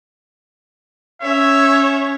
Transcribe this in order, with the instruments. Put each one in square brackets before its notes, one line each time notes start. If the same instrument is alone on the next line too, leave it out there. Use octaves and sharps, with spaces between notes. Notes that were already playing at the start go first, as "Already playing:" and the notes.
[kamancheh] C#4 C#5 [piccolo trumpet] E5